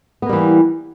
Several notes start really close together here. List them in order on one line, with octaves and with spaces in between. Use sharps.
B3 A#3 G3 E3